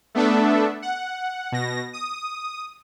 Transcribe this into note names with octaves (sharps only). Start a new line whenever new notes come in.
A3 B3 D4 A4 E5
F#5
B2 A#6
D#6